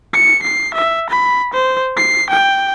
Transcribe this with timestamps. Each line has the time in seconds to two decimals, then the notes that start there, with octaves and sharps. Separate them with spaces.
0.13 C#7
0.43 C7
0.74 E5
1.10 B5
1.53 C5
1.97 C7
2.30 G5